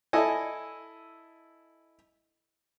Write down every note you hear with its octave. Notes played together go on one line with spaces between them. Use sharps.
E4 A4 D#5 G#5